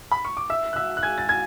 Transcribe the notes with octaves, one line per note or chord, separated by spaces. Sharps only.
B5
C#6
D6
E5 E6
F#6
E5 E6
F#6
G#5 G#6
A6
G#5 G#6